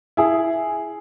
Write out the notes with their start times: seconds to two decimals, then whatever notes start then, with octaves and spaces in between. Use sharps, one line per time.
0.17 E4 G#4